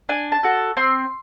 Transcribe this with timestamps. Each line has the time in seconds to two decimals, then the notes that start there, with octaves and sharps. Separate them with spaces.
0.09 D4 G#5
0.32 A5
0.43 F#4 A4
0.77 C4 C6